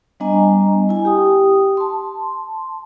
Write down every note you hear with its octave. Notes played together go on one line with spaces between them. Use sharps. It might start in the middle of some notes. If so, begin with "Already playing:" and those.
G3 B3 D4 D#5 G#5 A#5
E4 G#5
G4 G5 D#6
A5 C6